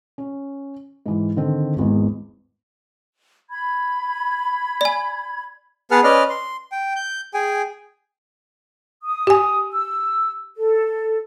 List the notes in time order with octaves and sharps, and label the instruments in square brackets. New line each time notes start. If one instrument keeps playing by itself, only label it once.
[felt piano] C#4
G#2 E3
D3 D#3 C4
G#1 E2 G#2
[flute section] B5 G#6
[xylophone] D5 G#5
[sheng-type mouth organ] B3 G#4 B4 F#5 A5 F6
C#4 B4 D5 D#5 F6
C6
G5
G6
G#4 G5 G#5
[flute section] D#6
[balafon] G4 G#5
[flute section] E6
A4